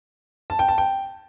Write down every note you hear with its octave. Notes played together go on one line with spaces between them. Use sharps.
A5
G5
A5
G5